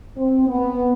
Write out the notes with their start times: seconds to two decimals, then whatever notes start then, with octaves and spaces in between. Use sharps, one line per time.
0.17 C4
0.48 B3